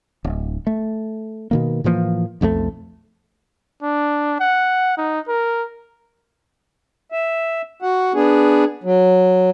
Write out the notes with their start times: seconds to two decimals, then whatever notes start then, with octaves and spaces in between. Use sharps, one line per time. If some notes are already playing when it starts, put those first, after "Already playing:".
0.24 D1
0.67 A3
1.51 B2 D#3 A#3
1.84 A2 E3 F3 A#3
2.41 B1 F2 F3 A3
3.83 D4
4.40 F#5
4.98 D#4
5.28 A#4
7.12 E5
7.82 F#4 F#5
8.14 B3 D4 G#4
8.84 F#3